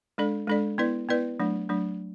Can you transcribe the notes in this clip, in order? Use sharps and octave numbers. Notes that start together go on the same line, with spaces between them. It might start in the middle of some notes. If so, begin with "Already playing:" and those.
G#3 D4 A4 D5
G#3 D4 A4 D5
B3 E4 B4 D5
B3 E4 B4 D5
F#3 A3 D4
F#3 A3 D4